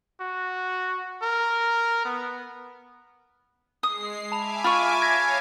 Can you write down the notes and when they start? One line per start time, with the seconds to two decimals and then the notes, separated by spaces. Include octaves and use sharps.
0.20 F#4
1.22 A#4
2.05 B3
3.83 G#3 D#6 C7
4.32 E5 G#5 A5 B5 D6 F7
4.64 F4 B5 C#6 F6 D#7
5.02 C#5 F5 G#5 G#6 A#6 B6